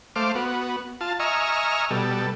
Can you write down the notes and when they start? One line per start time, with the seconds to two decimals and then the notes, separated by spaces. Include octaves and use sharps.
0.16 A3 C5 F5 D6
0.35 B3 F#4
1.01 F4 A5
1.20 D#5 E5 G#5 A#5 C#6 F6
1.91 B2 G3 A4